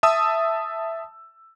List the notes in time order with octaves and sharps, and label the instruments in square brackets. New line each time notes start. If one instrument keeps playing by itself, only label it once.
[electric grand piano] E5 A5 D#6 E6